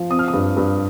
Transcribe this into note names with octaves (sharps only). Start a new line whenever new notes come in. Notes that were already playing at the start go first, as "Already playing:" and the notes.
Already playing: F3
C4 D#6
F6
D#6
G2
G2